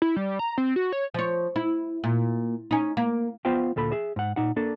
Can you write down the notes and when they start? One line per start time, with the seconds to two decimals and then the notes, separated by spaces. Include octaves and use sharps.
0.02 E4
0.16 G3
0.39 A#5
0.58 C4
0.76 F#4
0.92 C#5
1.14 F3 C#5
1.56 E4
2.04 A#2
2.71 C#4 D#4
2.97 A#3
3.45 B3 F4 C5 F5 G5
3.76 D2 A#2 A4 B5
3.92 G#4 E5
4.16 G#2 F#5
4.36 A#2 D#4 F#5
4.56 A#3 D4 A4